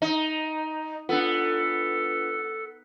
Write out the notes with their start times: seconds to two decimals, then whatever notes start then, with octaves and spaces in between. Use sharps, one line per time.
0.02 D#4
1.09 B3 D4 F4 A4